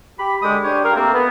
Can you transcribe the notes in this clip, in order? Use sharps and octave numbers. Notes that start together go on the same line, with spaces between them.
G4 B5
D3 G#3 G4 D#6
D4 G4 C5 C#5
G4 A#4 F5
A3 A#3 C4
B3